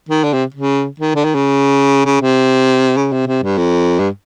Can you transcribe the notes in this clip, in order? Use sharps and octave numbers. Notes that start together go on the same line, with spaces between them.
D#3
D3
C3
C#3
D#3
D3
D#3
C#3
C#3
C3
C#3
C3
C3
G2
F2
G2